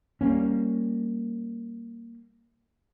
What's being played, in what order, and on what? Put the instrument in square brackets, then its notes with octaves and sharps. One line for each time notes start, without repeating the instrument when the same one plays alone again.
[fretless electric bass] G3 G#3 A#3 C#4